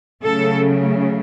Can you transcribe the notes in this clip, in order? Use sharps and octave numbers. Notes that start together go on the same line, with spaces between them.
C#3 F#3 A3 A4